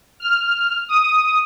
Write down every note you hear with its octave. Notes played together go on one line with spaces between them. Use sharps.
F6
D#6